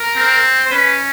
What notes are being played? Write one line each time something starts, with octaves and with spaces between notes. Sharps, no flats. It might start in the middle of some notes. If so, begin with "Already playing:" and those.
Already playing: A#4
C4
C5
C#4 B4